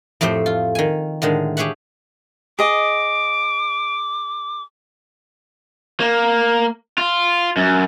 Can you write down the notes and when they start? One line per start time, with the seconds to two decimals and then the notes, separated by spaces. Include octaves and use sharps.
0.21 F2 A2 A3 G4 C5
0.46 F4
0.75 D#3 G#5
1.22 A2 D3 D#3 G#3
1.57 G4 G#4 C#5 E5 F#5
2.59 G#4 D#5 D6 D7
6.00 A#3
6.98 F4
7.57 F#2